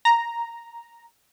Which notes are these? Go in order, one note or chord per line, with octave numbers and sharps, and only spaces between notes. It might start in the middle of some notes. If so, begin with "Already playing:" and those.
A#5